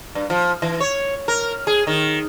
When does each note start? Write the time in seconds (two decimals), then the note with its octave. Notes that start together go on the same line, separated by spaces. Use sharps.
0.15 G2
0.30 F3
0.62 E3
0.80 C#5
1.28 A#4
1.67 G#4
1.87 D#3